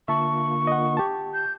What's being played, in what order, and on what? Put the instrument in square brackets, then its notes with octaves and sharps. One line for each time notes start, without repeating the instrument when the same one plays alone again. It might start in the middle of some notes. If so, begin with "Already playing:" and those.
[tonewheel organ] D3 A#3 F4 [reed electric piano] E5 A5 [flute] C#6
[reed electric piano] D#5 F#5
G4 A5
[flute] G6